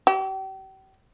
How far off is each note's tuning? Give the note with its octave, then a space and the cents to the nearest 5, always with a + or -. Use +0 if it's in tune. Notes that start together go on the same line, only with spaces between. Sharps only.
G4 -40